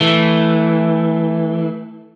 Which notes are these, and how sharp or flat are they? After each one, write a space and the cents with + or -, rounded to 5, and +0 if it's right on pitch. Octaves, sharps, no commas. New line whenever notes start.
E3 -10 A3 +0